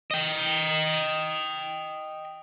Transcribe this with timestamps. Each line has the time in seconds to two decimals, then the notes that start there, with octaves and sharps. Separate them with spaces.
0.11 D#5 G5